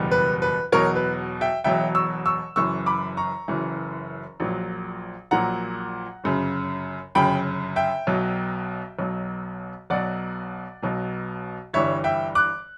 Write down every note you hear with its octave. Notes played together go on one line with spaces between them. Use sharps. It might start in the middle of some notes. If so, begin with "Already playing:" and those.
Already playing: F#1 E2 B2 G3
B4
B4
E1 E2 B2 F#3 A#4 C#5
B4
E5 G5
E1 E2 B2 F#3 E5 G5
C#6 E6
C#6 E6
F#1 F#2 E3 C#6 E6
B5 D6
A#5 C#6
F#1 F#2 E3
A#1 A#2 F#3
A#1 A#2 F#3 F#5 A#5
G1 F#2 C#3
G1 F#2 C#3 G5 B5
E5 G5
B1 B2 F#3
B1 B2 F#3
B1 B2 F#3 D5 F#5
B1 B2 F#3
G1 G2 E3 G3 C#5 E5
E5 G5
D6 F#6